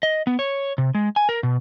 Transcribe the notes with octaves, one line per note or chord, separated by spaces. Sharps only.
D#5
B3
C#5
C3
G#3
G#5
A#4
B2